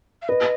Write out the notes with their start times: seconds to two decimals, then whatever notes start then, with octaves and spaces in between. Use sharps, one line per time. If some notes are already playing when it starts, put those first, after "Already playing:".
0.22 F5
0.29 B4 D#5